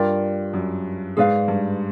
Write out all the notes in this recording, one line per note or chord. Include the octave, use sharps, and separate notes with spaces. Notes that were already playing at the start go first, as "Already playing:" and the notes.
Already playing: G2 F4 A#4 D5 G5
F#2
G#2 G#4 B4 D5 F5
G2